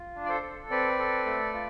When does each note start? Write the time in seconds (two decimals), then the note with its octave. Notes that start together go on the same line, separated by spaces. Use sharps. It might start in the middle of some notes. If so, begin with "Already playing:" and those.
Already playing: F4
0.16 D4
0.25 D5
0.29 A4 C5
0.42 A4
0.70 C4 B4 D5
0.99 A4
1.26 A3
1.54 F4